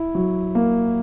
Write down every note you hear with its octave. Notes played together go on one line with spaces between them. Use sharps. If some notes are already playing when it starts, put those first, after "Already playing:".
Already playing: E4
F#3
A#3